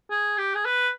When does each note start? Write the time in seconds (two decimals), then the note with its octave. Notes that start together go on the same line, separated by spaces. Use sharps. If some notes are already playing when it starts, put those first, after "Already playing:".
0.10 G#4
0.38 G4
0.55 G#4
0.65 B4